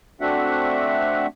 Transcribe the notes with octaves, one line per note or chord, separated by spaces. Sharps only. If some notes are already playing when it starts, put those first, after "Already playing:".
A3 C4 D4 F#4 E5 F#5